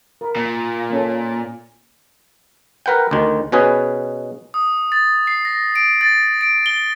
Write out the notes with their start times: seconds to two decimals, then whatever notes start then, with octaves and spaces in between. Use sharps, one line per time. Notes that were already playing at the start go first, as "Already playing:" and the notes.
0.21 A#4 B5
0.36 A#2
0.90 A#3 C#4 A4
2.86 A#4 B4 F#5 G5
3.11 D2 D#3
3.52 B2 C#4 G#4 B4
4.54 D#6
4.92 A6
5.27 C7
5.45 A#6
5.76 D7
6.01 A6
6.41 D7
6.66 G7